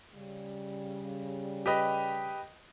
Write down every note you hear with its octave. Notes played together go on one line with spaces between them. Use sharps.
C#3 G3
G4 B4 D#5